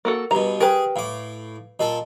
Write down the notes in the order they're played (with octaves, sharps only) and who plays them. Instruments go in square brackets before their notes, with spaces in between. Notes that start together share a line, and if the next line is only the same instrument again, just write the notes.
[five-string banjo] A#3 F#4 A4 [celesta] A#4
[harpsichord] G2 B2 [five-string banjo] A#5
[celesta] G4 G5 [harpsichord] G#4 [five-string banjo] A#4 B4
[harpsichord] A2 D6 [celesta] F5
[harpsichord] A#2 A4 [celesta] D#5